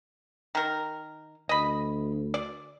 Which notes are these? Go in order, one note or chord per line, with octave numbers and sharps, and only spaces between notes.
D#3 A#4
D2 D#5 B5
D5